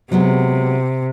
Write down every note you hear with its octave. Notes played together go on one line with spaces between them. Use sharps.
C3 F#3 G#3 B3